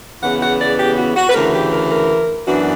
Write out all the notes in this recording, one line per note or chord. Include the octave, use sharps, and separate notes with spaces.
E2 C#3 E3 B3 F#5
F#5
D5
G4
F#4
F#4
B4
D2 C#3 E3 A#4
G4
A#4
A#4
F#2 E3 B3 D4 F#4